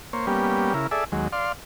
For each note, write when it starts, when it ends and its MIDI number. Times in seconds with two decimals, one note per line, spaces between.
0.13 0.26 58
0.13 0.26 72
0.13 0.26 73
0.27 0.73 55
0.27 0.73 58
0.27 0.73 59
0.27 0.73 61
0.27 0.73 67
0.74 0.87 49
0.74 0.87 64
0.74 0.87 70
0.91 1.04 68
0.91 1.04 69
0.91 1.04 74
0.91 1.04 76
1.12 1.28 39
1.12 1.28 54
1.12 1.28 56
1.33 1.52 74
1.33 1.52 77
1.33 1.52 84